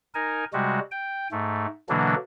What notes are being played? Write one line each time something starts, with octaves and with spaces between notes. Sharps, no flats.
D#4 A#4 G#5
C3 G3 G#3 F#4
G5
G#2 A3
B2 D3 E3 F#3 A#3 D4